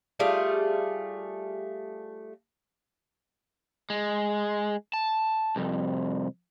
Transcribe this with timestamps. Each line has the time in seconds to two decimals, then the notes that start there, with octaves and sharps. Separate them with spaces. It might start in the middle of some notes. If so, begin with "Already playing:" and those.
0.19 G3 A3 F4 G#4
3.90 G#3
4.93 A5
5.56 C2 F2